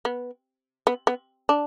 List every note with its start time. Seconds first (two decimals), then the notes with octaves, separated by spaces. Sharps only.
0.05 B3
0.87 B3
1.07 B3
1.49 D4